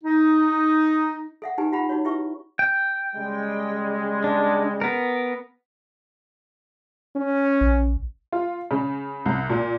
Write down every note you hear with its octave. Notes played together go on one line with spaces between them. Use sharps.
D#4
A4 E5 F#5
D#4 G4 B4 G#5 A#5
F4 G4 F#5 A#5 B5
D#4 F#4 C#5
E4 G4 B4 E5 C#6
G5
C#3 G3 G#3
D4
B3 A#4
C#4
A#1
F4
C#3
C2
A#2